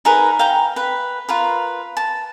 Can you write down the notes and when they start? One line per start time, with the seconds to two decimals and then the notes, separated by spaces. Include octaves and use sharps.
0.05 D#4 G#4 A#4 B4
0.39 F5 G5 A#5
0.76 B4 B5
1.29 F4 A#4 B4
1.97 A5